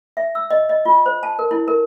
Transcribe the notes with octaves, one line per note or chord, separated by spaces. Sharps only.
E5
E6
D#5
D#5
F4
C5
A5
A#4
E4
A#4